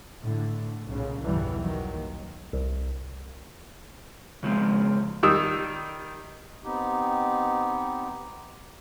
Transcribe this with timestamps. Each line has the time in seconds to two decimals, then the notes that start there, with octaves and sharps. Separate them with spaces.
0.23 A2 D3
0.86 B1 A#2 C#3
1.21 B1 E2 G2 D3 E3 G3
1.61 D#3 F#3
1.90 D#2
2.53 C2
4.43 C#3 F3 G#3 C4
5.23 D#3 G3 D#6 E6
6.64 B3 C4 D#4 G4